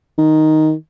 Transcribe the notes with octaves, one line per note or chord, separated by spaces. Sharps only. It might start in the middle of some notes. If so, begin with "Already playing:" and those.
D#3